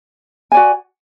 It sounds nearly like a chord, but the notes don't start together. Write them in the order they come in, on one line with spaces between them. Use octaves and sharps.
G#5 D5 F#4